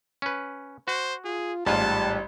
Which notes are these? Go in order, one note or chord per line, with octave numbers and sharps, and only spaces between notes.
C#4 B4
F#4 C5
F4 G#4
A1 G#2 G3 F4 A5